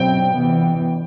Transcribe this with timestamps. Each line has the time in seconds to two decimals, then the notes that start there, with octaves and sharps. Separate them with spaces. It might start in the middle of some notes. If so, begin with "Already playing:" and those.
Already playing: B2 F#3 C4 G5
0.33 C3 E3 B3